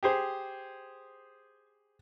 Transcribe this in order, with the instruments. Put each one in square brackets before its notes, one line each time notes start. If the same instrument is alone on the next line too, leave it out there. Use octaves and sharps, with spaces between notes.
[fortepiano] G4 G#4 C5